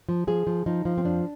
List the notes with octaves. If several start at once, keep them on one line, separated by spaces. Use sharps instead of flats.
F3
F3 G#4
F3
F3 D#4
F3
C4
F2 D4